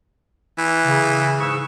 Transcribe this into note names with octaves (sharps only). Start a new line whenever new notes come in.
E3
C#3
G#2 G#4 C#6 E6